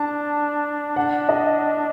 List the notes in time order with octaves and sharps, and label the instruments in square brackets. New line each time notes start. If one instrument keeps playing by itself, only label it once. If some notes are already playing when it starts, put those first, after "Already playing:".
Already playing: [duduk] D4 [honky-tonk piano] A5
[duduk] D4 [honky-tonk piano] F#5
[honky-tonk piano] D#5